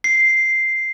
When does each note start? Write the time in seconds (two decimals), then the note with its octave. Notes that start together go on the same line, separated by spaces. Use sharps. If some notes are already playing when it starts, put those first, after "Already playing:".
0.04 C7